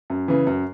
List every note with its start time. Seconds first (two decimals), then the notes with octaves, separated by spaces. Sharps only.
0.10 F#2
0.28 C#3 E3
0.47 F#2